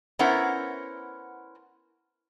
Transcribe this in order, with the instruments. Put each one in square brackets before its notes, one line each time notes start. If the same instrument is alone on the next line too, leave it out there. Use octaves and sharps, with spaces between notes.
[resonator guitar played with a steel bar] B3 C#4 E4 A#4 C5 F#5